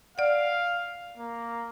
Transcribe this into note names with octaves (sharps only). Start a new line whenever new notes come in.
D5 F5 F#5
A#3